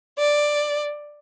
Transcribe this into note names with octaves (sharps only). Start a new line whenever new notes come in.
D5